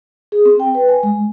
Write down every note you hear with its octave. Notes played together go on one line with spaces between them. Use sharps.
G#4
C4
G5
B4
G#5
G#3